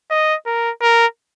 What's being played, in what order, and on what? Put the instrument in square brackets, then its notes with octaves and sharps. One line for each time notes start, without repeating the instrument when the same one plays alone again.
[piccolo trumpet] D#5
A#4
A#4